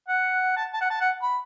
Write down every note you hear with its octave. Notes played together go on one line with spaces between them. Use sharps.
F#5
A5
A5
F#5
A5
F#5
B5